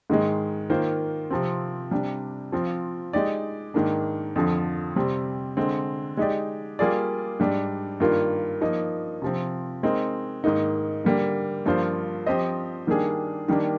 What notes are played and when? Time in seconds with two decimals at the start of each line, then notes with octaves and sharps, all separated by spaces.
0.10 G#2 D#3 G#3
0.70 D#3 A#3 F4 C5
1.30 C3 F3 C4
1.91 C3 G3 D4
2.52 F3 C4 F4
3.13 G#3 D#4 G4 D5
3.74 G#2 D#3 A#3 D4
4.36 F2 D3 F3
4.96 C3 G3 C4
5.57 D3 G#3 C4
6.17 G#3 D#4 G4 D5
6.79 G3 A#3 F4 G#4 D5
7.39 G#2 G3 D4
8.00 G2 D#3 A#3 F4 A#4
8.61 F3 A#3 D#4
9.22 C3 F3 C4
9.83 G#3 C4 D#4 A#4
10.44 G#2 D#3 A#3 D#4
11.04 D3 G3 A#3
11.66 G2 F3 A#3 F4 C5
12.26 F3 C4 G4 C5 D#5
12.87 D#3 G3 A#3 D4 G#4
13.48 D#3 G3 A#3 D4